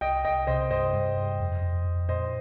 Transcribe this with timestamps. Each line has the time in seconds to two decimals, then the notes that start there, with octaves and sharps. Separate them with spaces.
0.01 C2 D#5 G5
0.25 C2 D#5 G5
0.47 C3 C5 D#5
0.70 G2 C5 D#5
0.93 G2
1.17 G2
1.40 F2
1.62 F2
1.85 F2
2.09 A#2 C5 D#5